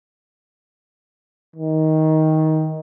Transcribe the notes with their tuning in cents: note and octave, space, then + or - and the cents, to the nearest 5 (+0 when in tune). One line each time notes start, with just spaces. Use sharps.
D#3 +15